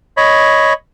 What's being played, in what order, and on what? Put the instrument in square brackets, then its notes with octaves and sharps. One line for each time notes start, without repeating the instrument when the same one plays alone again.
[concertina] C#5 D#5 B5